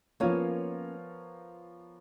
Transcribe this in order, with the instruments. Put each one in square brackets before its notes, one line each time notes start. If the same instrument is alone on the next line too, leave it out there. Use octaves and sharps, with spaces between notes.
[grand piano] F3 B3 F4 A#4 C#5 [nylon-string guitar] A#3 C#4